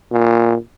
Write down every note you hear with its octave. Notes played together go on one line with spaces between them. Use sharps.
A#2